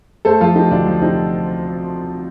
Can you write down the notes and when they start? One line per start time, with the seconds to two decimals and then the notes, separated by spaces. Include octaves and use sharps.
0.25 A3 A4 C5
0.41 F3 F4 A4
0.55 A3 D#4 G4
0.71 D2 D4 F4
0.87 F3
1.01 C3 C4 D#4